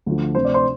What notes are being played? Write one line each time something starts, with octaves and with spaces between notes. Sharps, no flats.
D2 D3 F3
D2 C3 F3 C5
D5
C5 C6